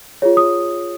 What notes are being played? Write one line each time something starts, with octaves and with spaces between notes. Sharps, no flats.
F4 G#4 C#5
D#6